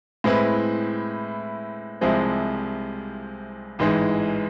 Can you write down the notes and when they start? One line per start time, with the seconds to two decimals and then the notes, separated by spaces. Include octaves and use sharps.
0.24 A2 G#3 C4 E4 B4
2.01 C2 C3 F3 G#3 C4
3.79 A1 G#2 E3 G#3